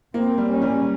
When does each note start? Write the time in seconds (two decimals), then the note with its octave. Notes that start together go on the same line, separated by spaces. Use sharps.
0.13 A#3 C4
0.38 G3
0.50 C#4
0.62 G3